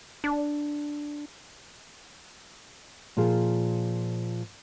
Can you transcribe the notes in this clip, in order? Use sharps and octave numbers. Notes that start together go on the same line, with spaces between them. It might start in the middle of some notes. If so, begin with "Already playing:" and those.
D4
A#2 F3 F4 G#4